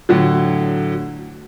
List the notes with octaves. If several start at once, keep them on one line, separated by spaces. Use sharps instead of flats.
A2 D3 F#3